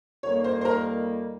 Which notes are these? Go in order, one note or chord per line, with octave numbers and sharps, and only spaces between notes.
F2 D#3 G3 A#3 C#5
C5
C5
A#4